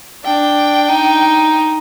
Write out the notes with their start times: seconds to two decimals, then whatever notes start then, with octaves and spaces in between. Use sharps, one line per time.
0.24 D4 G5
0.89 D#4